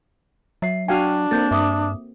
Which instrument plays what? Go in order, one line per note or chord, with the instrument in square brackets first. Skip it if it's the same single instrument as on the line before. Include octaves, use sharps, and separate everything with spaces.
[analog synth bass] F#3 [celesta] E5 C7
[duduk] D4 [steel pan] F#4 F5 G#5 [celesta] G5
[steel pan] A#3 C4 A4 [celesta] G6 A6
[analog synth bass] G2 [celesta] E5 D6 D#6